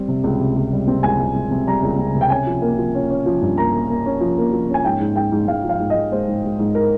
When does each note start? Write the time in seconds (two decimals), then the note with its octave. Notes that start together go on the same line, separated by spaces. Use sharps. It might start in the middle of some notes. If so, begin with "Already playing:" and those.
Already playing: G3 C4
0.08 C3
0.24 C#2
0.40 C3
0.56 C#2
0.72 G3
0.87 C4
1.03 C#2 G#5
1.20 C#2
1.36 C#2
1.51 C3
1.67 G3 A#5
1.83 C#2
1.99 C#2
2.15 C3
2.21 G5
2.30 C#4 G#5
2.46 F3
2.62 A#3
2.78 F3
2.95 C#4
3.10 C#4
3.26 F3
3.41 G2
3.58 A#3 A#5
3.73 A#3
3.89 A#3
4.06 C#4
4.21 F3
4.38 A#3
4.52 F3
4.69 C#4 G#5
4.85 G#2 G5
5.00 G#2
5.16 G#2 G5
5.32 G#2
5.48 G#2 F5
5.64 F3
5.69 F5
5.79 G#2
5.90 D#5
5.95 G#2
6.11 G#3 C5
6.28 G#2
6.44 G#3
6.59 G#2
6.75 A#4